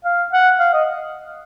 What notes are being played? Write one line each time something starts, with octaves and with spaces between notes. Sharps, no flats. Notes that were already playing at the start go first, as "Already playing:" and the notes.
F5
F#5
F5
D#5